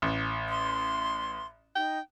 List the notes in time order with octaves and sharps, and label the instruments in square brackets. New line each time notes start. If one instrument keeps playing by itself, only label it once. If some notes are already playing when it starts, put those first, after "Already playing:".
[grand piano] A1
[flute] C6
[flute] D#4 [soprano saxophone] G5